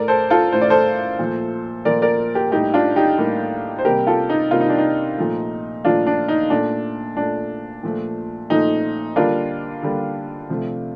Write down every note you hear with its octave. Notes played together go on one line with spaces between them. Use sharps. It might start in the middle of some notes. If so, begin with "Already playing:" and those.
Already playing: A2 A3 A#4 D5
A4 C5
F4 A4
A2 A3 C5
D5
A4 C5
A#2 F3 A3
A#2 F3 A3 A#4 D5
A#4 D5
G4 A#4
A2 G3 A#3 D#4 G4
D4 F4
D#4 G4
A2 G3 A#3
C5
C3 G3 A#3 G4 A#4
F4 A4
D#4
C3 G3 A#3 F4
D#4
D4
D#4
A#2 F3 A3
A#2 F3 A3 D4 F4
D4
D#4
A#2 A3 D4
A#2 A3 D4
A#2 F3 A3
A#2 F3 A3 D#4
D3 G3 A#3 D4 F4
D3 G3 A#3
C3 F3 A3